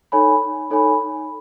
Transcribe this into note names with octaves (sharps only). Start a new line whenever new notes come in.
D#4 A4 C#5 G#5 B5
D#4 A4 C#5 G#5 B5